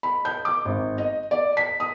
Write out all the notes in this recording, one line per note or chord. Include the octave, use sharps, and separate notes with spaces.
B5
G6
D6
G#1
D#5
D5
B6
D#6